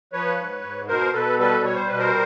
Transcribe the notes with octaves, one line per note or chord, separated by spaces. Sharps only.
F3 B4 C#5
G#2
G#2
B2 A#4 C5
B2 A4 B4
G3 A4 B4
G3 C#5
C5
B2 B4
A#4 C5